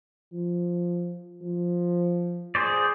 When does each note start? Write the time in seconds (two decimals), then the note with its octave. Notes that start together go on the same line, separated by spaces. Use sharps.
0.32 F3
1.41 F3
2.55 G#4 C5 D5